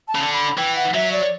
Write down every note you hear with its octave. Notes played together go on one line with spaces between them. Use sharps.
A5
C#3
D3
B5
E3 G5
F#5
F#3 E5
D5